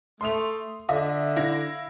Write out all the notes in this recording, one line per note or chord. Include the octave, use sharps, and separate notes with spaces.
A3 C6 D#6 F7
D3 F4 D#5 E5
E4 F5 A#6